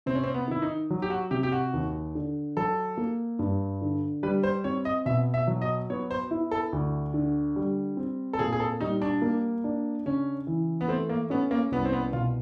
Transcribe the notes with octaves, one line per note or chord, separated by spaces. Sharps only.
C3 C4
C#4
C4
B3
D#3 E4
D#4
F#3
G4
F#4
C3 G4
G4
F#4
D#2
D3
F#3 A4
A#3
G2
D3
G3 B4
C5
C4 C#5
D#5
B2 E5
E5
F#3
D#5
B3 C#5
C5
E4
A4
D2
D3
G3
C4
A4
A#2 G#4
G#4
A4
G3 D#4
D4
A#3
D4
C#3 C#4
E3
B3
A3 C4
A#3
B3 C#4
A#3
C2 B3
C4
B3
B2 F4